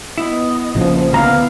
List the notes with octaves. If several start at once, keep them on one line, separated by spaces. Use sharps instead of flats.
B3 E4 D#5
A#1 C#3 F3 A#3
D2 B3 E4 F5 A#5